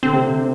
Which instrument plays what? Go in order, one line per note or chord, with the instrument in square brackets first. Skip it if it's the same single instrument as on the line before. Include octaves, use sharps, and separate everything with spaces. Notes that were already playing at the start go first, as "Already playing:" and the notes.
[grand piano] D3 [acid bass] C4
[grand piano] C3
D3